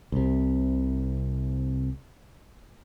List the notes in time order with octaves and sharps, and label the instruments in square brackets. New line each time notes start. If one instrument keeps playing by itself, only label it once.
[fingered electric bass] C2 C3